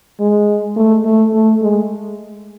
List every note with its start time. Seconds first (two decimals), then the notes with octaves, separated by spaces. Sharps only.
0.20 G#3
0.76 A3
1.05 A3
1.33 A3
1.62 G#3